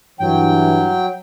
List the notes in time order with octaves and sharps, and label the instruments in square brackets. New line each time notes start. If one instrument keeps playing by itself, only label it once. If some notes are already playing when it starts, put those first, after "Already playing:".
[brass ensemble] G2 E3 [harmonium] F#3 G5